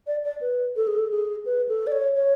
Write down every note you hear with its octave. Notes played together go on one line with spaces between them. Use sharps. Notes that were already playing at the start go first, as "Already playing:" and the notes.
D5
D5
B4
A4
G#4
A4
G#4
B4
A4
D5
C#5
C#5